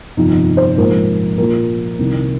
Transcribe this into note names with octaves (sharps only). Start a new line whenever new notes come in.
G1 F2 C3 F3 D#4
C5
A#1 G#2 F3 A#4
A#1 A#2 F3 A#4
C2 C3 D#3